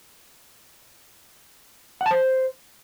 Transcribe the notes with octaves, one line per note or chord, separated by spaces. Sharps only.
F#5
A5
C5